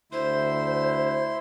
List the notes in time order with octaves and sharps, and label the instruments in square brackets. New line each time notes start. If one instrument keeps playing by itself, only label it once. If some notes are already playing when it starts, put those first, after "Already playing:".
[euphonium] D2 [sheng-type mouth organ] E4 C6 [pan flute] C5